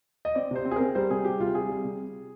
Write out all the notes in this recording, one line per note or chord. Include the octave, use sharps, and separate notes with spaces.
D#5
C4 D5
C3 C5
C4
G#4
C4 A#4
G3 C5
C3 G#4
G3 G4
C3 F4
G3 G#4
G3
C3